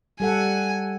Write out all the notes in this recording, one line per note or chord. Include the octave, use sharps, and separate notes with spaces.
G3 A4 F#5 G#5